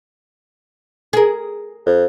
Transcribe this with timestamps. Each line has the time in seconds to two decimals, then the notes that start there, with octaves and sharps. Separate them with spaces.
1.13 G#4 A#4
1.86 F2